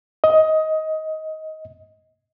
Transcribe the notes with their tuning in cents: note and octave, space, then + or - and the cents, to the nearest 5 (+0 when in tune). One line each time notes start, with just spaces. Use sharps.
D#5 +15